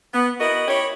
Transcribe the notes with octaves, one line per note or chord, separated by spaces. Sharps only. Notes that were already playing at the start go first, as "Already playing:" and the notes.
B3
E4 F#4 A#4 D#5
E4 G4 C#5